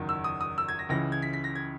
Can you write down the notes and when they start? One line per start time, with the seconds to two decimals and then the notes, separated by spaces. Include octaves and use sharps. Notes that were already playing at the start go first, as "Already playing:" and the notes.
Already playing: F#1 E2 D#3 F#3
0.09 E6
0.24 D#6
0.41 D#6
0.58 E6
0.69 G#6
0.79 A#6
0.89 C#2 C#3 E3 A#6
1.12 G#6
1.22 B6
1.33 B6
1.44 A#6
1.55 G#6